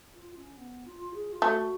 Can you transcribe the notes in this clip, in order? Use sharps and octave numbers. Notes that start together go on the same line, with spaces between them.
F4
C#4
B3
F4
G#4
F4
A3 F#4